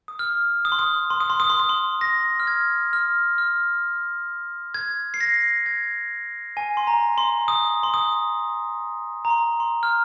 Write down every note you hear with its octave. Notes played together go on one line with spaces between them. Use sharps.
D#6
F6
D#6
C6
D#6
C6
D#6
C6
D#6
C6
D#6
C6
A#6
F6
G#6
F6
F6
G#6
C7
A#6
G#6
G#5
C6
A#5
C6
D#6
C6
D#6
A#5
C6
C6
F6